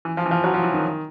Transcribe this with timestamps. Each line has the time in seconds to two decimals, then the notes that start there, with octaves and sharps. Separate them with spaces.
0.05 E3
0.17 F3
0.26 E3
0.31 F3
0.44 F#3
0.54 F3
0.63 E3
0.74 D#3